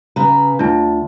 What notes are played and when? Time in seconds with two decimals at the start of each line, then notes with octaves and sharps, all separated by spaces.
0.16 C#3 B4 A#5
0.59 D2 D4 F4 A5